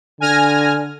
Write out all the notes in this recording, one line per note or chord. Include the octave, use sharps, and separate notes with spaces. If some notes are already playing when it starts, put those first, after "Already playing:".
D3 G#5 F6 A#6